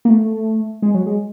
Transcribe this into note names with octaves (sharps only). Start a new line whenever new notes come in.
A#3
A3
G#3
F#3
G#3